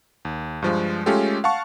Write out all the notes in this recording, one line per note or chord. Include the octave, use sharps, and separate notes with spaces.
D#2
G2 F3 G#3
G#3 A3 C#4 F4 G4 A4
F5 F#5 A5 C#6